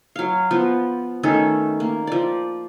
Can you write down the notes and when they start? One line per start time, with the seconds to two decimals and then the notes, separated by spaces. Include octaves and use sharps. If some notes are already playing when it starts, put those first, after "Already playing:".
0.16 F#3 F5
0.51 F3 B3
1.23 D#3 A3 C#4 A4
1.80 A#3
2.07 F3 D5